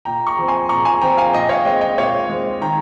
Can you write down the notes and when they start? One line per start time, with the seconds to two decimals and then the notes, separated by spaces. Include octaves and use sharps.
0.05 A#2 G5 A#5
0.27 A#5 C#6
0.38 F3 C4
0.48 G#5 C6
0.69 A#2 A#5 C#6
0.85 G#5 C6
1.01 F3 C4 G5 A#5
1.17 F5 G#5
1.33 A#2 D#5 G5
1.49 C#5 F5
1.65 G#3 C4 D#5 G5
1.81 D#5 G5
1.98 A#2 C#5 F5
2.29 G#3 C4
2.61 D#3 G5 A#5